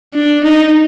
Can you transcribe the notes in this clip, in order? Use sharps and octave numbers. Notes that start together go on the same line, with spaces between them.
D4
D#4